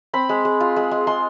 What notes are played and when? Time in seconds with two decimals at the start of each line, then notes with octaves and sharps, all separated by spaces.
0.13 C4 B5
0.29 G#3
0.45 G#3
0.61 F4
0.76 G#3
0.91 G#3
1.07 G#3 C6